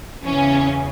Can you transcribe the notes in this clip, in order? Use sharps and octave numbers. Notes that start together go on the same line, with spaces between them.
E2 C#3 E3 C#4